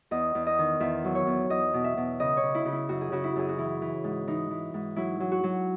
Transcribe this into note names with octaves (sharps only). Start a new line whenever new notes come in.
E2 D#5
E2
D#5
D#3
E2 E5
F#3
C#5
E2
E2 D#5
B2
E5
B2
C#3 D#5
C#5
C#3
E4
C#3
E4
F#2 F#4
G#4
C#3 F#4
E4
F#2 G#4
F#4
E3 E4
E3
G#2
E3 D#4
E3
G#2
F#3 E4
F#3
F#4
F#3